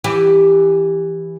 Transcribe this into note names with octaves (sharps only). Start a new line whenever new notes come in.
E3 G4